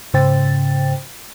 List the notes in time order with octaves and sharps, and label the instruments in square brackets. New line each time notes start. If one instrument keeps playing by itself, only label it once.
[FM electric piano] G#2 C#3 C5 G5 A6